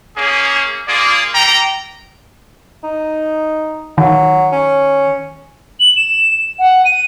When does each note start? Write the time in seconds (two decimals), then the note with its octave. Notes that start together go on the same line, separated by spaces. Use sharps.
0.16 A#3 C#4 G#4
0.87 A#3 F4 G#4 D5
1.32 G3 G5 A#5
2.83 D#4
3.98 D#3 F#3
4.52 C#4
5.80 F#7
5.96 E7
6.59 F#5
6.85 D#7